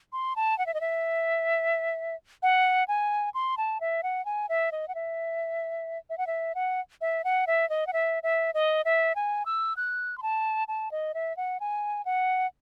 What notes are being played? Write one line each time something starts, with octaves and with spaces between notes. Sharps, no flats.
C6
A5
F#5
E5
D#5
E5
F#5
G#5
C6
A5
E5
F#5
G#5
E5
D#5
F#5
E5
E5
F#5
E5
F#5
E5
F#5
E5
D#5
F#5
E5
E5
D#5
E5
G#5
E6
F#6
C6
A5
A5
D#5
E5
F#5
G#5
F#5